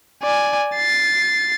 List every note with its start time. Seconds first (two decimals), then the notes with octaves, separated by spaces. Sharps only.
0.23 D5 G#5
0.76 A6 C7